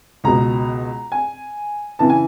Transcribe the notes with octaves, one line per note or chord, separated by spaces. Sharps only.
C#2 B2 A#5
G#5
C#3 E3 A5
G#5